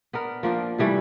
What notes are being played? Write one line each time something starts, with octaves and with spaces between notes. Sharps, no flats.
B3 D4 A#4
F3 A#3 D4
C3 E3 G3 A3